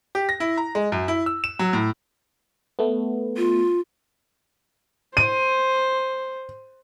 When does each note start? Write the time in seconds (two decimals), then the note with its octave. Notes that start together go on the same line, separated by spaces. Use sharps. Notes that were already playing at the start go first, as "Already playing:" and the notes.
0.15 G4
0.29 A#6
0.40 E4
0.57 A#5
0.75 G#3
0.92 F#2
1.08 E4
1.26 E6
1.44 E7
1.59 F#3
1.73 A2
2.79 A3 B3
3.37 F4
5.17 C5 D#7